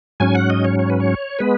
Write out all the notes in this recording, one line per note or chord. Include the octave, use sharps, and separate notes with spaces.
G#2 F#3 C#4 G#5
F#5
D#5
C#5
C#5
B4
C#5
G#3 B3 B4